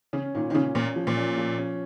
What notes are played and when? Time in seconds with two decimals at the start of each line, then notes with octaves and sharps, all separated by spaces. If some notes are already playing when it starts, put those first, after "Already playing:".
0.13 C#3 C#4
0.35 A#2 D#3
0.50 D#3
0.55 C#3 C#4
0.75 A#2 C#4
0.96 F3
1.07 A#2
1.17 C#4
1.37 F3
1.58 C#4